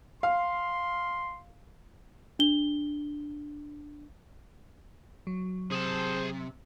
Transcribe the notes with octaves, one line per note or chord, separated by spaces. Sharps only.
F5 C6
D4 G7
F#3
C3 G#4 C5 A5